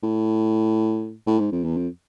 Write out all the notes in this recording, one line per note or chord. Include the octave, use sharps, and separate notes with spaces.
A2
A2
G#2
F2
E2
F2